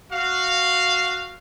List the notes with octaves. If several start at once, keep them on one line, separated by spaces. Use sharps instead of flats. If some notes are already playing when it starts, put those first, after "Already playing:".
F#4 F5